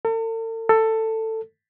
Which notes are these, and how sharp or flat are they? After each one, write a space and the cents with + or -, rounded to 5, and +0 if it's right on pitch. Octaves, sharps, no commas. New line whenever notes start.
A4 +45
A4 +15